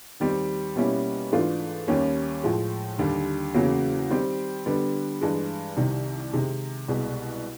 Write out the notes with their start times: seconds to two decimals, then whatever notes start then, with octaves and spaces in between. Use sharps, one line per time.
0.20 D#2 D#3 G3 C4
0.76 B2 G3 A#3 C#4 E4
1.32 G#2 E3 A3 D4 F4
1.88 D#2 D#3 G3 A#3 C#4
2.43 A2 F3 G#3
2.98 D#2 D3 G3
3.54 E2 C#3 F#3 A#3
4.10 D#3 G3 C4
4.66 D3 G3 B3
5.21 G2 E3 G#3
5.77 C2 C3 D#3
6.33 C3 D#3 G#3
6.88 C2 B2 G#3